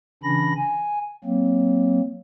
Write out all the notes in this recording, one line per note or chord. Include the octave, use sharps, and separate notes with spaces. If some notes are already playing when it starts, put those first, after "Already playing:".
C#3 E3 C#4 D4 B5 A#6
G#5
F#3 A#3 C4